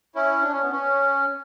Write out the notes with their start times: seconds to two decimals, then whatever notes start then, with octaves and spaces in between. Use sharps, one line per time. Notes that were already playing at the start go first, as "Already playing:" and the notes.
0.15 C#4 E4
0.42 D4
0.52 C#4
0.62 B3
0.72 C#4